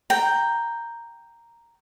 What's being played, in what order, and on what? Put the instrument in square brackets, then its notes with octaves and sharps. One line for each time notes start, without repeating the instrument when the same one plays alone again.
[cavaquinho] G5 A#5